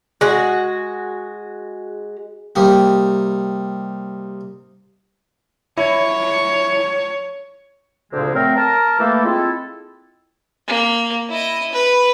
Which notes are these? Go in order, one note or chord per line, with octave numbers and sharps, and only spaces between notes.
G#3 F#4
C3 G3 A#3 D#4
E4 C#5
D2 A#2 C#3 F3 G#3 C4
F#3 A3 C4 A#4
A#4 A5 A#5
E3 A3 A#3 E4 G4 A4
G#3 C4 E4 F4 A4
A#3
E4 D#5
B4